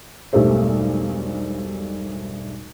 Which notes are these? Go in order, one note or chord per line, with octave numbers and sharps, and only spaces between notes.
E1 B1 G2 G3 A3 C5